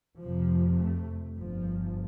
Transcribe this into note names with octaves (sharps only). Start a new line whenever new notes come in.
F1 F2 C3 F3
A3
G1 G2 F3